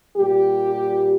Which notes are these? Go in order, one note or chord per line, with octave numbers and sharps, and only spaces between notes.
A#2 G3 G4